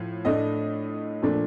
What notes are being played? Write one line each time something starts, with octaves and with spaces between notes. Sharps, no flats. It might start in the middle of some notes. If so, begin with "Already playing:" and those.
Already playing: A2 F3
A2 A3 D4 D#5
A#2 F3 A3 D4